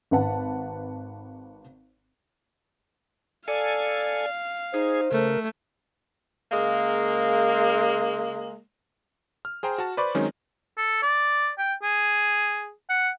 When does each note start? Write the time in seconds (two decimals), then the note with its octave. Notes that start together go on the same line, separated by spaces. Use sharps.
0.11 G#1 B4 F#5 A5
3.48 A4 D5 F5 G#5
4.74 D#4 G#4 C5
5.12 C#3 A3 A#4
6.51 C#3 G#3 A#3
9.45 F6
9.63 G#4 C5 G5 A#5
9.78 F#4 A5
9.97 B4 C5 D5 B5 C#6
10.15 D#3 F#3 G#3 C4 C#4 D#4
10.77 A4
11.02 D5
11.58 G5
11.83 G#4
12.90 F#5